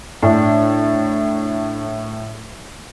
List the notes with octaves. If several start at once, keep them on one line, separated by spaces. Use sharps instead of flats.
A2 D4